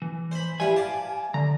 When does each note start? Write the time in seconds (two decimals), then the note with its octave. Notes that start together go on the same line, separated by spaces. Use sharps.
0.02 E3
0.31 C5 B5
0.60 E3 G3 F5 G#5
0.76 F5 A5 D6
1.34 D3 A#5